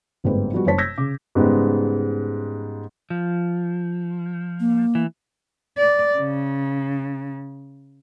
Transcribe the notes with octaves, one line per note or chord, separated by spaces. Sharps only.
G1 G#2 G3 A#3 C4 B4
F3 G3 B3 F#4
F#1 F#2 C5 C#5 A5 B6
E6 G6 G#6 A#6 B6
C#3 D6
G#2 C#3 G3 G#3 B3
F3
A#3
E3
D5
C#3